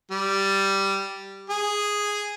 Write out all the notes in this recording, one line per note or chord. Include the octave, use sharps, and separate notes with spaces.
G3
G#4